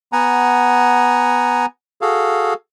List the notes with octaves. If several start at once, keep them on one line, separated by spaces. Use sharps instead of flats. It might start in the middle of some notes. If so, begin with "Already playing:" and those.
B3 F#5 G#5 A#5
F#4 G#4 A4 F5